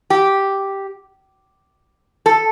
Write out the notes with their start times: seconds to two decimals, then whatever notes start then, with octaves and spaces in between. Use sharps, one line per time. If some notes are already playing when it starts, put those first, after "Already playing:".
0.10 G4
2.26 A4